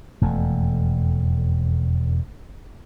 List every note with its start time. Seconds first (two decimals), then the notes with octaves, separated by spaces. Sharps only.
0.22 E1 F2 A3